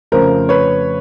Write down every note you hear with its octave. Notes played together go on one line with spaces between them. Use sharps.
F2 C#3 F3 A3 A#4 C5
B4 C#5